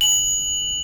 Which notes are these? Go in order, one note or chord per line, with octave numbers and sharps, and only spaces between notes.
F#7